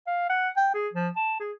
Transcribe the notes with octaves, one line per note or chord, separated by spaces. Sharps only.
F5
F#5
G5
G#4
F3
A5
G#4